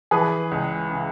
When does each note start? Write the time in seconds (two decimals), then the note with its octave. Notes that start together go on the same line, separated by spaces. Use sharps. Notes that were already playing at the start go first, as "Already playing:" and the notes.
0.11 E3 G#4 B4
0.51 C#2
0.90 C#3